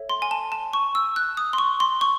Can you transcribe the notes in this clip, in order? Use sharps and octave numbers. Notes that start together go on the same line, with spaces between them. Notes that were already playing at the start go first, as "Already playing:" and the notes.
Already playing: A4 C#5 E5
C6
G#5
A5
A5
C#6
E6
F#6
D#6
C6
C#6
C6
C#6